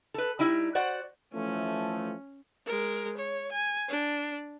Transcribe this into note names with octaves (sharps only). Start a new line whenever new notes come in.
A4 B4
G3 D#4 E4
F#4 C5 D5 F#5
E3 F3 A3 C#4
G#3 A#4
C#5
G#5
D4